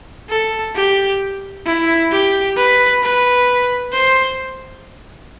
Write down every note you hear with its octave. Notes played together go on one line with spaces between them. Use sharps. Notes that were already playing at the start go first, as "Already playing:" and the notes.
A4
G4
E4
G4
B4
B4
C5